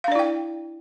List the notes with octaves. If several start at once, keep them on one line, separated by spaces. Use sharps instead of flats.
D4 E4 D5 F5 G5